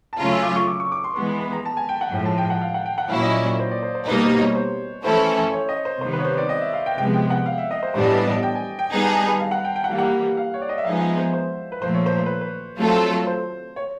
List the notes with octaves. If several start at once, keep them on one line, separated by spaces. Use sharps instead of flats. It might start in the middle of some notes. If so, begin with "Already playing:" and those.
A5
C#3 F#3 A3 C#4 F4 A#5
E6
D6
C#6
D6
C#6
D6
C6
E3 G#3 B3 C6
B5
B5
A#5
A5
G#5
G5
F#5
A2 F3 G#3 G5
A5
G5
F#5
F5
F#5
G5
F#5
A#2 F#3 A#3 C#4 E4 F5
D#5
C#5
D5
C#5
C5
D5
C5
C5
B2 G3 A#3 D#4 B4
C5
C#5
C5
E3 A3 C#4 E4 A4 C5
C#5
D#5
C5
C3 D#3 G3 B3 C5
B4
C#5
C5
D5
D#5
E5
F5
G5
C3 F3 G#3 B3 G5
G5
F#5
F5
E5
D#5
C5
A2 E3 G3 B3 D4 C5
D#5
D5
D#5
G5
G#5
G5
G3 B3 D#4 G#4 G#5
A5
A#5
B5
F5
F#5
G5
G5
F#5
E3 G3 A#3 F5
F#5
F5
C#5
D5
D#5
E5
F3 G#3 B3 D#4 G#4 F5
E5
C5
C5
B4
A#2 F3 A3 C5
C#5
C5
C5
B4
B4
F#3 A3 C4 F4 A4
C5
C#5